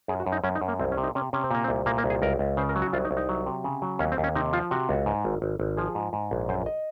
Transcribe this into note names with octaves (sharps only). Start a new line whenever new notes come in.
F#2 G#4
F#4
F#2
D#4
F#2 C#4
D#4
F#2
A#3
C2 C4
C#4
C3
D#4
C3 C#4
C3 C#4
C4
A#2 A#3
C4
C2
A#2 A#3
A#3
C2
G#4
C#2 A#4
C#2
C#3 C5
A#4
F#3
F#4
C2 F4
D#4
C2
D#4
F#3
C3
C#3
F#3
D#2 C#4
C4
D#2
C#4
C3 D#4
F3 F4
C3 F#4
C#2
G#2
G#1
G#1
G#1
F3 G#4
G#2
G#2
A#1
F#2 C5
D#5